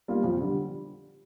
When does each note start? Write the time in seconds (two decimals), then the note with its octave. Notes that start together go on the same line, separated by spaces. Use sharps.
0.08 G3 A#3 F4
0.24 F2
0.40 D3 G3